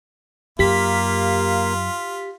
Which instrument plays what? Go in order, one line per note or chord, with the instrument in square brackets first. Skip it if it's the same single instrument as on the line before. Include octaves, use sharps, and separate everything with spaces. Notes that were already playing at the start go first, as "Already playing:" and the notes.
[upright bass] F#2 [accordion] A#3 [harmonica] F4 [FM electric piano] G4 B6